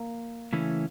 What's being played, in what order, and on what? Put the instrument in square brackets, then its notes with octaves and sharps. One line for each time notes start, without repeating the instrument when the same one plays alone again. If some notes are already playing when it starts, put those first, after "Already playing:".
Already playing: [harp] A#3
[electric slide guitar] C#3 E3 A3 C#4 E4